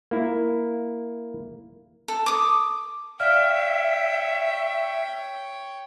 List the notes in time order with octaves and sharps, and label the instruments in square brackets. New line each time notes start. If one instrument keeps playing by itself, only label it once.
[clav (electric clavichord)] A#3 E4
[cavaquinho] A4
D6 D#6
[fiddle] C#5 G5 [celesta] D5 F5 F6 [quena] E5